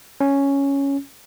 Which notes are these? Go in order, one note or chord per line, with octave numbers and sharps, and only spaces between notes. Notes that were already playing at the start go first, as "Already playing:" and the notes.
C#4